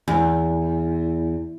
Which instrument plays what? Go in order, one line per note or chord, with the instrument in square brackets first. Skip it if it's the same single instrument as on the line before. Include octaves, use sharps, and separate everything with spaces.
[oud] E2